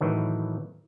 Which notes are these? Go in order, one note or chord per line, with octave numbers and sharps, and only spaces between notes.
A2 D#3 E3 F#3